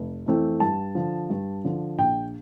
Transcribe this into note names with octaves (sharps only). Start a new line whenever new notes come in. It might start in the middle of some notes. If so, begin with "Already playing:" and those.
Already playing: F1
F2 E3 A3 C4
G2 A5
D3 F3
G2
D3 F3
A#1 G5